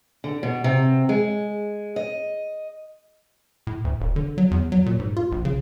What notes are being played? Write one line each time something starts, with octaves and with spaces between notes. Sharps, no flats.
D3
B2
C3
G#3
D#5
A2
D2
E1
D3
F#3
E2
F#3
A#2
G#2
F4
A#1
C#3